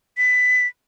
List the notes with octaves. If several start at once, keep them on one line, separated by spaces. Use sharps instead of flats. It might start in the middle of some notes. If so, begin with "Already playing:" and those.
B6